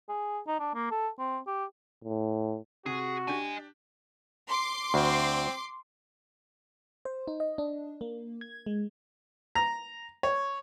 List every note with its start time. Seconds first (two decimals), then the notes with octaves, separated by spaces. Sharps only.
0.09 G#4
0.47 D#4
0.59 D4
0.75 A#3
0.91 A4
1.19 C4
1.47 G4
2.04 A2
2.86 C3 F#4 G#4
3.28 D4 G4 D#5 G#5
4.48 C6 D6
4.94 D2 C4
7.05 C5
7.28 D#4
7.40 D#5
7.58 D4
8.01 A#3
8.41 G#6
8.66 G#3
9.55 A#5
10.23 C#5